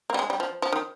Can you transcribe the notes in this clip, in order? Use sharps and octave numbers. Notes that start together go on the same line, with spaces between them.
A#3
G3
G#3
G3
F3
F3
D#3